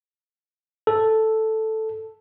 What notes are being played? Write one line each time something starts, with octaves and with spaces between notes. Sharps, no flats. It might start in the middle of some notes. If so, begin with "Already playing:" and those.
A4